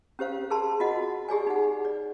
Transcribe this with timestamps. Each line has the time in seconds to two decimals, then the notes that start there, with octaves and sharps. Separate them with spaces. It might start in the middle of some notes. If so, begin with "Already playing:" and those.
0.19 C#4 G4 C5 F5
0.50 G#4 A#4 A5 C6
0.80 F4 F#4 D#5 F#5
1.29 G4 G#4 D5 G#5
1.47 D#4 F#5
1.85 D5